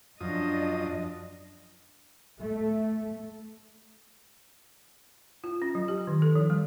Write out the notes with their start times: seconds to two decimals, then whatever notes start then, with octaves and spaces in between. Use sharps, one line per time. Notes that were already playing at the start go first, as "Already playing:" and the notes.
0.20 F#2 F3 D4 D#5 D#6
2.40 A3
5.44 F4
5.62 C#4
5.75 F#3
5.88 G4
6.07 D#3
6.22 A4
6.35 F3
6.50 G3